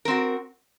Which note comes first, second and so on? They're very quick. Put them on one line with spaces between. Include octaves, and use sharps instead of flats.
A#4 C4 F#4